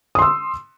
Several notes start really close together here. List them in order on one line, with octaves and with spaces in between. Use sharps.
D#6 C6 E6